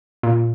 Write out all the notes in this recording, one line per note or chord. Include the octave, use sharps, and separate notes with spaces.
A#2